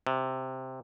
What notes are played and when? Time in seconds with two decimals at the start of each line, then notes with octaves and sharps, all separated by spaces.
0.07 C3